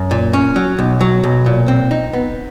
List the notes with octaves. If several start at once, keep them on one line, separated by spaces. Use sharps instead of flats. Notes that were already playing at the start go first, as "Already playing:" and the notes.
Already playing: F#2
A#2
C#4
F#3
B1
F#3
B1
A#2
C4
D#4
B3